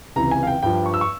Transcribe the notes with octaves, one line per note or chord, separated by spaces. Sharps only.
C#2 C3 E3 A#5
G#5
F5
G5
G2 F3 G5
C#6
E6
C#6